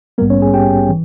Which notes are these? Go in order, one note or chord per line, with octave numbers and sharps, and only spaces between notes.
A#1 G#2 G3 A#3 B3 A#4
C#4 C#5
G#4 G#5
G4 G5
E3